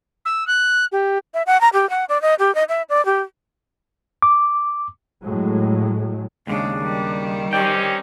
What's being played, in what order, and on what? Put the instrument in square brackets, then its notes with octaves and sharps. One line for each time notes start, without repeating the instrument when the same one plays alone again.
[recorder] E6
F#6
G4
[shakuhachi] E5
F#5
A#5
G4
F#5
D5
D#5
G4
D#5
E5
D5
G4
[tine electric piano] D6
[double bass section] A2 F#3 G#3
[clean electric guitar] D#2 A#2 C#3 [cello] G#3 [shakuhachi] D4
[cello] D#3 G3
[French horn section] C4 C#4 D#4 [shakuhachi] G4 [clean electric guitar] D5 G5